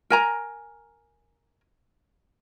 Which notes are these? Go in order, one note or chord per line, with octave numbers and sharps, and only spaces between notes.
A#4 G#5 A#5